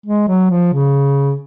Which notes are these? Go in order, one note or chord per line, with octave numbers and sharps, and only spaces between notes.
G#3
F#3
F3
C#3